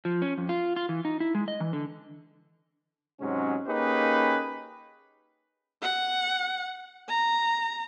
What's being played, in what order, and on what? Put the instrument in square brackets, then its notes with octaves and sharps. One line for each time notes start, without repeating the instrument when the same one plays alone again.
[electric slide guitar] F3
C#4
F2
F4
F4
E3
D#4
E4
G#3
D#5
E3
D3
[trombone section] G#2 C3 F#3 G#3 C#4
A#3 C#4 D#4 G4 G#4 B4
[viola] F#5
A#5